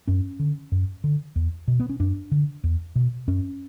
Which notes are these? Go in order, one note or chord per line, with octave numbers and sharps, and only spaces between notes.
F#2 C#4
D3
F#2
D3
E2
B2
B3
C#4
F#2 D4
D3
E2
B2
F#2 C#4